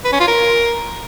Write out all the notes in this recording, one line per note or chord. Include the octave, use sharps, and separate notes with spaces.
B4
C#4
F4
A#4